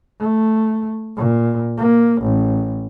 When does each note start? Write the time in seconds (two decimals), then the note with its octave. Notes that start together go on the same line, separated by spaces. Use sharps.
0.21 A3
1.16 A#2
1.78 A#3
2.22 A1